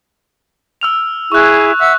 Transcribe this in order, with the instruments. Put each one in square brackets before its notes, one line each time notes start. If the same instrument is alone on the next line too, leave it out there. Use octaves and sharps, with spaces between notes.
[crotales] E6 F6 F7
[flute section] E4 G#4 [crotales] C#6 F#6
[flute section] E5 F#5 E6